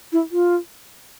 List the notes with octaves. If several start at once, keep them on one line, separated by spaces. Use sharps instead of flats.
E4
F4